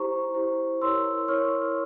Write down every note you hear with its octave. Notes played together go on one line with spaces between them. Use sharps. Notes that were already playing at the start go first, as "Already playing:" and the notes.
Already playing: E4 G4 C5 A#5 C#6
E4 G4 C5
E4 A#4 C#5 C6 E6
E4 A#4 C#5 C#6 F6